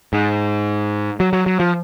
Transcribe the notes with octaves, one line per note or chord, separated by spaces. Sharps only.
G#2
F#3
F#3
F#3
F3